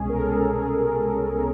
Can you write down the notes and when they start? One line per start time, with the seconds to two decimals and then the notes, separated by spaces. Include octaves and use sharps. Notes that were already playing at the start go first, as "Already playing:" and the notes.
Already playing: C2 B2 G#3 C#4 G#4
0.09 A#4
0.17 A4
0.25 G#4
0.56 G#4